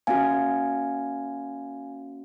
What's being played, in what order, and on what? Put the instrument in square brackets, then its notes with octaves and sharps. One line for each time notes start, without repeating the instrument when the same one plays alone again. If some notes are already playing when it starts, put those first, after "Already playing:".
[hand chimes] A#3 C#4 F#4 F5 G#5